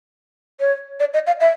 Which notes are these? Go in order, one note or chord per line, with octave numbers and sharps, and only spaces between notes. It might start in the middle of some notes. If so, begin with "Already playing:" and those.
C#5
D5
D#5
F5
E5